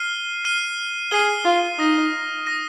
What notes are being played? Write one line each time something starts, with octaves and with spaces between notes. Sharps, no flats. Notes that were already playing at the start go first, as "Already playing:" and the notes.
Already playing: F6 C7 D#7 G7
F6 C7 D#7 G7
G#4 F6 C7 D#7 G7
F4
D#4 D#6 A#6 D#7
D#6 A#6 D#7